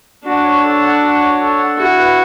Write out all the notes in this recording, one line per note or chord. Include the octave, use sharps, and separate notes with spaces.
D4 F#4
C#5
A4
F#5
F#4
C#5
A4
F#5
E4 F#4
B4